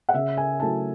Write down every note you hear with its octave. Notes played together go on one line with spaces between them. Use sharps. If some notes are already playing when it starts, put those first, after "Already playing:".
F#5
C#3 E5
G#5
F#3 A3 E4 A5